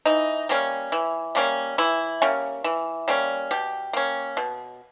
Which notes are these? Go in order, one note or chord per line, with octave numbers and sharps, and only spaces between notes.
E3 D#4
G3 A#3 C#4
E3
G3 A#3 C#4
E3 E4
G3 A#3 C#4
E3
G3 A#3 C#4
B2 G4
A#3 C#4
B2